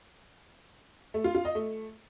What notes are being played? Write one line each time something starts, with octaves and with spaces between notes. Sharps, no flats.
A3
F4
F4
D#5
A3